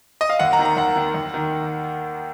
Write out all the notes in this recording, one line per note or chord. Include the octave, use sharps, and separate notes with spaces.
D#5
F5
D#2 F#5
A#5
D#3
A#5
D#2 F#5
D#3
D#2
D#3